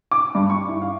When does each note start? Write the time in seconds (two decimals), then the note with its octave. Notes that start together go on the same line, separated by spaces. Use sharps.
0.11 D6
0.35 G2
0.50 C#6
0.69 E4
0.82 F5